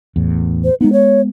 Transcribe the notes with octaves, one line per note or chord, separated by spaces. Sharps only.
E2 A2
C5
G#3 B3 D#4
C#5